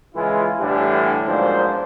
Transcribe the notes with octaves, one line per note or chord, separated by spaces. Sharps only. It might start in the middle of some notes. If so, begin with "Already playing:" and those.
C#3 E3 G#3 E4 F4
A2 D3 E3 G3 D4 G4
B1 G#2 F3 A#3 D4 C5